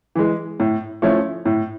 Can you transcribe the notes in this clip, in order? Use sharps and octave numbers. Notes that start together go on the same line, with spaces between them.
E3 G#3
A2
F3 A3 C#4 E4
A2